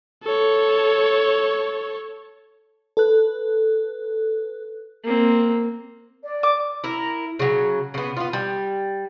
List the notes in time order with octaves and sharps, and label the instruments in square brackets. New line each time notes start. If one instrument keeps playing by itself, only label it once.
[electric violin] A4 C#5
[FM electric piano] A4 B4 F#6
[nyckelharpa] A#3 C4
[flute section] D5
[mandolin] D6
[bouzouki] E4 A#4
C#3 F#3
C#3 B3
B3 F4
G3